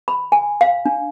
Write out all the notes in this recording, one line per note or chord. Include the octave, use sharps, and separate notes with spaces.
B5
G#5
F5
D4